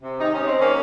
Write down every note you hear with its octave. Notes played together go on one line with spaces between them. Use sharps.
C3
D#3 G#3 D#4
C#4
C3
C4
D#3 G#3 A#3 C#4